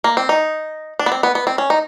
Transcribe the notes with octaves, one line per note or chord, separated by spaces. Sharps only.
A#3
C4
D#4
D4
B3
C4
B3
B3
C4
C#4
D#4